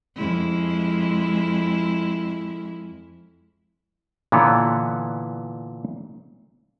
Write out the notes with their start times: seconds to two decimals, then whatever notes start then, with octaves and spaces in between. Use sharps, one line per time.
0.15 F2 G#3 E4
4.32 A#2 D3 E3 B3 C#5